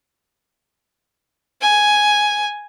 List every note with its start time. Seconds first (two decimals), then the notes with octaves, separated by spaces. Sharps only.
1.61 G#5